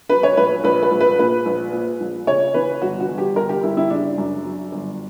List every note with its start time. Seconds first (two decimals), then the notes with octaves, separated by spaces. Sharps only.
0.09 F#3 B4
0.23 C#5
0.37 A#1 B4
0.64 A#1 B4
0.83 B4
0.91 A#1
1.01 B4
1.19 A#2 B4
1.46 A#1
1.73 A#2
2.00 A#1
2.27 C#3 C#5
2.54 E3 B4
2.82 G1 F#4
3.00 F#4
3.09 G1
3.18 G4
3.36 G1 A#4
3.49 G4
3.63 G1 E4
3.77 E4
3.90 C#3 D4
4.18 F#2
4.44 F#3
4.72 G1